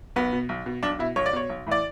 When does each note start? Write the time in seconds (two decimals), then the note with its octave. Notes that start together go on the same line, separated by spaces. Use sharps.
0.16 B1 B3
0.33 B2
0.49 B1
0.66 B2
0.83 B1 D4
0.99 B2 E4
1.16 B1 C#5
1.26 D5
1.33 B2 C#5
1.49 B1
1.67 A2 E3 D5